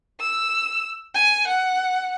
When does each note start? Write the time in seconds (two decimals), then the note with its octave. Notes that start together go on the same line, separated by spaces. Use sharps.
0.20 E6
1.14 G#5
1.48 F#5